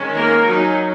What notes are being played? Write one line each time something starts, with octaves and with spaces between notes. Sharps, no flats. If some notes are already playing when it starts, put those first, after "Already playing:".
Already playing: D#3 G#3 C#4
A#3 A#4
F#3 C#4 D#4